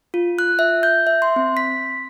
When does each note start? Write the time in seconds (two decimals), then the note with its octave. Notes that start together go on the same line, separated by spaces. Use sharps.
0.14 F4
0.39 F#6
0.59 E5
0.83 G6
1.07 E5
1.22 C6
1.36 C4
1.57 B6